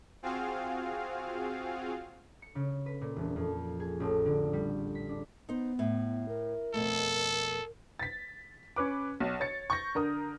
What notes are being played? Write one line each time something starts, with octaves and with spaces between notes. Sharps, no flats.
C4 F4 F#4 G#4 F5
C#7
C#3
B4
A#2
E1
F2
G#4
A1
D3
G3
B6
D4
B3 D#4 C5
A2
A#4
F2 B2 A3 A4
A6 B6
C#4 B4 D6
B1
C#5 A6 C#7
C#6 G6 A#6
D3 A#4 D#6